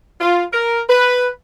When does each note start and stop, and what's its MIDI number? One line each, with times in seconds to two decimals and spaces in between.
0.20 0.43 65
0.52 0.80 70
0.88 1.27 71